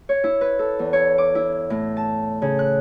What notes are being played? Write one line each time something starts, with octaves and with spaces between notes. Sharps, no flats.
C#5
E4
B4
A4
E2
C#5
D6
E4
A2
A5
C#3
F#6